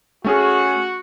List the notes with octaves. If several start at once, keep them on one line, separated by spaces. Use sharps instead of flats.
A3 C#4 F#4 G#4